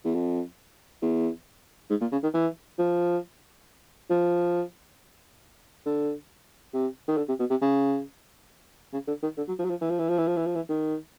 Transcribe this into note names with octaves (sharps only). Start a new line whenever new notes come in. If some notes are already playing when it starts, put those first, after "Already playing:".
E2
F2
E2
G#2
A#2
C#3
D#3
E3
F3
F3
D3
C3
D#3
D3
C3
B2
C3
C#3
C#3
D3
D#3
D3
F#3
F3
F#3
F3
E3
F3
E3
F3
E3
F3
E3
F3
E3
D#3